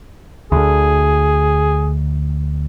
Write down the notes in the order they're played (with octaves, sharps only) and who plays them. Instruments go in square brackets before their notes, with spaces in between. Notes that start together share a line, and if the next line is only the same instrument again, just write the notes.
[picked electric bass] D2 D3 [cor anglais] G#4